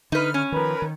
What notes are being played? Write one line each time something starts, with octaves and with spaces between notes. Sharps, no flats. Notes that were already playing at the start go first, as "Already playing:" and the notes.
D3 D#4 B4 F6
C#4
D#3 F3 A#4 B4
D#3